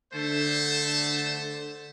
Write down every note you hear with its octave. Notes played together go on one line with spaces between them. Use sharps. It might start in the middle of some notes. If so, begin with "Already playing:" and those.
D3 A3 C5 A5